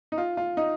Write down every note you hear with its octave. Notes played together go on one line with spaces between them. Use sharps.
D#4
F4
F4
D#4